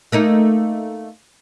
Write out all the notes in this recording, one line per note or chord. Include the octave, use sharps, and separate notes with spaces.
A3 A#3 D#4